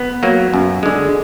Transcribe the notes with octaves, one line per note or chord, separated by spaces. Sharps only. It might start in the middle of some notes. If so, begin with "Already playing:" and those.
Already playing: B3
F#3 A#3
F#2
D3 G#3